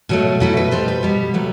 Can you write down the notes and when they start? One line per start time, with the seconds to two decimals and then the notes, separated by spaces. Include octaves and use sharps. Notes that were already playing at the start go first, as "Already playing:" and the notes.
0.09 B2 F#3 A3
0.40 B2 F#3 A3 E4
0.57 B4
0.71 B2 G3 C5
0.88 B4
1.03 B2 G3
1.34 C3 F#3 A3